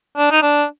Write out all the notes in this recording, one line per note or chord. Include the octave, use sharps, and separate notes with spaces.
D4
D#4
D4